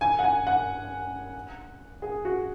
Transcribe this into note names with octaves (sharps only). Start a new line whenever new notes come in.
G#5
F#5
G#5
F#5
G#4
F#4